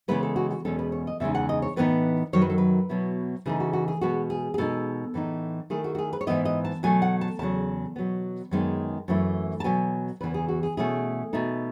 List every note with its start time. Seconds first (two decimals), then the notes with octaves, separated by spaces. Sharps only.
0.08 C#3 E3 G#3 B3 E4 B4
0.23 A4
0.36 F#4
0.51 F#4
0.65 E2 B2 G#3 C#4 A4
0.79 B4
0.92 C#5
1.07 D#5
1.20 E2 C#3 E3 G#3 D#4 E5
1.35 F#5
1.49 D#5
1.62 C#5
1.76 A2 E3 B3 D#4 B4
2.33 F#2 D#3 F#3 C#5
2.42 B4
2.50 A4
2.58 B4
2.89 B2 F#3 B3 E4
3.46 C#3 E3 A3 D#4 G#4
3.60 F#4
3.73 F#4
3.88 G#4
4.01 B2 G#3 B3 F#4
4.30 G#4
4.54 G#4
4.58 B2 G#3 D#4 A4
5.14 A2 E3 B3 D#4
5.70 D#3 A3 E4 G#4
5.84 F#4
5.95 F#4
5.98 G#4
6.13 B4
6.21 C#5
6.27 G#2 E3 B3 E4 D#5
6.45 D#5
6.65 A5
6.83 B2 F#3 A3 G#5
7.02 F#5
7.21 A5
7.39 E2 C#3 F#3 A5
7.96 B2 F#3 B3
8.51 F#2 D#3 G#3 B3 D#4
9.08 F#2 E3 A3 E4
9.60 A5
9.64 B2 F#3 B3 G#5
10.21 E2 C#3 E3 B3 B4
10.34 G#4
10.48 F#4
10.63 G#4
10.77 B2 A3 C#4 E4 G#4
11.33 B2 A3 D#4